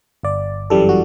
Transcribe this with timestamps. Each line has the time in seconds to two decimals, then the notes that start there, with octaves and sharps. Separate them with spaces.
0.23 G1 D5
0.70 F#2 E3 G3 A4
0.89 F#4